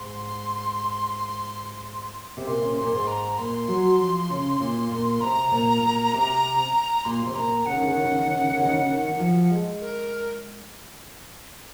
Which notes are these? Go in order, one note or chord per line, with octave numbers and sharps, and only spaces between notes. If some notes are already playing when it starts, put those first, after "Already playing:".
Already playing: G#2 C6
C3
A#2 C6
C#3
C3
C6
A#2
G#2
A#5
A#2 C6
F#3
F3
C#3
A#2
A#2
C3 A#5
A#2
A#2
C3
A#2 C6
C3
A#2 A#5
C#3 F#5
D#3
C#3
D#3
C#3
D#3
C#3
D#3
C#3
D#3
C#3
D#3
C#3
D#3
C#3
D#3
D#3
F3
G#3
A#4